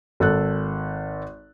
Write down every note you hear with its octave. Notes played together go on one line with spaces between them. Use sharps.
G#1 A4 F#6